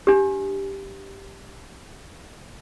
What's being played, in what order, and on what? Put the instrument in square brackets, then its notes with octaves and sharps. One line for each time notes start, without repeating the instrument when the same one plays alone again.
[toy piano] D4 G4